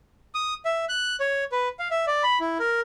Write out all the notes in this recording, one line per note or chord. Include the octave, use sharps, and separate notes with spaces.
D#6
E5
F#6
C#5
B4
F5
E5
D5
B5
E4
A#4